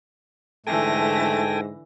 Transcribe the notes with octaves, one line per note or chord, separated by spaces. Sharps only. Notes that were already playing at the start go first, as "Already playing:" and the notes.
G#2 D3 E3 A3 A4 G5 G#5 A#6